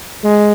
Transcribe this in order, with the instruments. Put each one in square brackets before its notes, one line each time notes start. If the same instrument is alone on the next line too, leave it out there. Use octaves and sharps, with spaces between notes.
[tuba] G#3